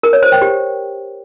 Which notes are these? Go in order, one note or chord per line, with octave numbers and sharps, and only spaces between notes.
A#4
C#5
C5
G5
G4